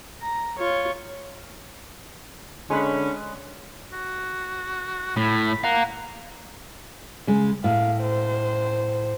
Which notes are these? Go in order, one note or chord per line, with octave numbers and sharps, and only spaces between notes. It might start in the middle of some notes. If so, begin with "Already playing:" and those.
A#5
F4 C#5
D3 G#3 C#4 B4 B5
F#4
A2 B5
F5 F#5 A#5
C#3 G#3
A2 F5
C5